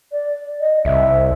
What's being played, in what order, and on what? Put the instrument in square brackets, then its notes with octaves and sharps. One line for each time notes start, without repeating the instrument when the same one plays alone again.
[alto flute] D5
D#5
[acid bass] C2 [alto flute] E5